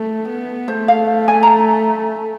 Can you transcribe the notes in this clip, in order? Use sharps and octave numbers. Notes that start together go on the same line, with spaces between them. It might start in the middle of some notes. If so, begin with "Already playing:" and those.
Already playing: A3
B3
A3 C5
F5
G#5
A#5